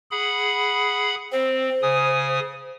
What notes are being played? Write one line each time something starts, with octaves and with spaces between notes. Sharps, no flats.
G#4 F#5 B5
C4 C5
C#3 G#5 D#6